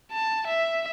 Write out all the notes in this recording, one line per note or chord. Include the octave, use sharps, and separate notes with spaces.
A5
E5